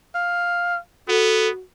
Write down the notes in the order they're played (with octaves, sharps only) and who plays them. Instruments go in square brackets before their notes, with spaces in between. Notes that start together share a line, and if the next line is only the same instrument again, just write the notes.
[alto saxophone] F5
[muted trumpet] B3 [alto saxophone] F#4 [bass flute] A4